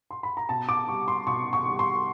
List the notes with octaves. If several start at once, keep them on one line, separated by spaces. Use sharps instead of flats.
C6
B5
A#5
B2 A5
D6
G3 C#6
C6
B2 C#6
C#6
G3
C6